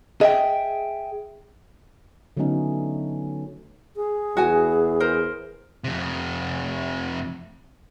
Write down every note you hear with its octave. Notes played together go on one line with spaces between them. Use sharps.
G#4 D#5 E5 G5
D3 F#3 A3 B3 C#4 D#4
G#4
E2 F#4 G#5
A#4 C5
F2 C3